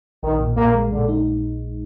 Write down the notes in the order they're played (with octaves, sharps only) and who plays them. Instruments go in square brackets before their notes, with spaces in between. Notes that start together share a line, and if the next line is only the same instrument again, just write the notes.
[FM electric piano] A#1 [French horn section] D#3
[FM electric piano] A#2
[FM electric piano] A#2 [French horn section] A#3
[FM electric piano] G#3
[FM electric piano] A#2 [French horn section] D3
[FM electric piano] D#4